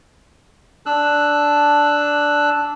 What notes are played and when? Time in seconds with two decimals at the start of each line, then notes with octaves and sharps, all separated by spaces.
0.86 D4 E6 F#6